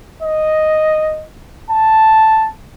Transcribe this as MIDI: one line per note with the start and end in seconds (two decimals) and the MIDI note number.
0.23 1.24 75
1.71 2.47 81